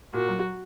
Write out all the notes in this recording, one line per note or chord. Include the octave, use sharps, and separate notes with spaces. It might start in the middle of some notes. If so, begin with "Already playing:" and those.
A#2 F#4
F#3